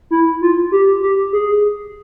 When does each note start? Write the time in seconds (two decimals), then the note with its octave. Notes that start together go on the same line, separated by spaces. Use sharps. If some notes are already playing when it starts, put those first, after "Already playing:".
0.11 E4
0.41 F4
0.72 G4
1.02 G4
1.33 G#4